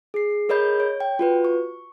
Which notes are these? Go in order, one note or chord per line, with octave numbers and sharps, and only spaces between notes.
G#4 C7
G#4 A#4 C#5 D#5 B5 G6
C#5
G5
F4 F#4 B4
C#6